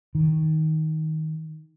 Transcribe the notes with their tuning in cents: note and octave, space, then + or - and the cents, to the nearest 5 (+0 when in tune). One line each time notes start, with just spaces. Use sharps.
D#3 +15